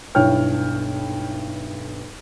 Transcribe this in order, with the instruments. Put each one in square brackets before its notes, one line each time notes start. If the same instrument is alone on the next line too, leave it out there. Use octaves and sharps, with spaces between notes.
[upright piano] B1 G2 E4 C#5 G5 F6